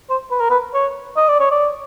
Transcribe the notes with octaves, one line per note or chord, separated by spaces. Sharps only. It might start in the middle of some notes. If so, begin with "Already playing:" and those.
C5
B4
A#4
B4
C#5
D#5
D5
C#5
D5